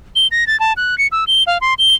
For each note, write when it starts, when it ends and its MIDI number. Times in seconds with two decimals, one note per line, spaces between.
0.16 0.27 103
0.31 0.47 94
0.47 0.59 93
0.60 0.73 81
0.77 0.98 90
0.98 1.07 97
1.12 1.25 88
1.27 1.43 103
1.47 1.58 77
1.61 1.74 84
1.79 1.95 103